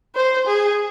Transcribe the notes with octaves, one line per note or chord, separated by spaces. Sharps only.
C5
G#4